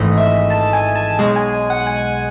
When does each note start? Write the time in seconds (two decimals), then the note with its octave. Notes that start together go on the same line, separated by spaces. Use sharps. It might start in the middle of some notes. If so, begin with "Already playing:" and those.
Already playing: G#1 G#2 E3 A3 D#5
0.17 E5
0.50 A5
0.73 G#5
0.95 A5
1.19 B1 B2 G#3
1.36 G#5
1.53 G#5
1.70 F#5
1.87 G#5